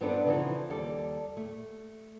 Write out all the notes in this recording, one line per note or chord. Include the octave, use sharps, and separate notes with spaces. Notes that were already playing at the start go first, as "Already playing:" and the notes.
G2 B3 C4 D4 A4 B4
C#3 E3 F3 D4 D#4 A4
D#2 G3 A4
A3